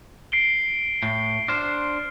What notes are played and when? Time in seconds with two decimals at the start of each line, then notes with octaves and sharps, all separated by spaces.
0.32 C7 D7 G7
1.03 A2
1.48 D4 C5 F6